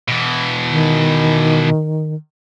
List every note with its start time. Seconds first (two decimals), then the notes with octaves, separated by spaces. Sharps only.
0.08 B2 E3
0.70 D#3